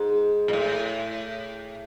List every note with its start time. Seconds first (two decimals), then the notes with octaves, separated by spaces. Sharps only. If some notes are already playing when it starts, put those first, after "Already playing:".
Already playing: G#2
0.48 A#2
0.53 A2